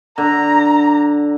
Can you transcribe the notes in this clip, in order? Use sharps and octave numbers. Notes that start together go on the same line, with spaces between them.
D3 A#5